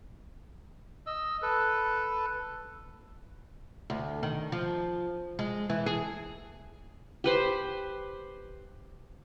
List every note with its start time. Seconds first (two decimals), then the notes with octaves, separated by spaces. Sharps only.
1.06 D#5 E6
1.42 A4 B4
3.90 D2
4.23 D#3
4.52 F3
5.39 G#3
5.70 E3
5.86 G#4
7.24 G4 B4 C5